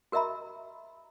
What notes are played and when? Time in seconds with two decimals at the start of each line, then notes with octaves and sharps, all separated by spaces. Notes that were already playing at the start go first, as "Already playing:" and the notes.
0.12 F#4 A#4 D#5 E5 A#5 B5